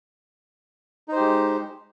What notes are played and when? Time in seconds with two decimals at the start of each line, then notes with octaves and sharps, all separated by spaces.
1.08 D#4
1.12 C5
1.16 G4
1.20 G#3